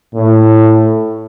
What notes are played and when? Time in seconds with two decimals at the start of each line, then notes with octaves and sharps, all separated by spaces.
0.15 A2